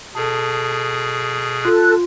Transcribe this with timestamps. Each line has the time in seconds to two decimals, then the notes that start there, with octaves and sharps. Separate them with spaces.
0.15 B2 G#4 A4 A5
1.65 F4 A4 F#6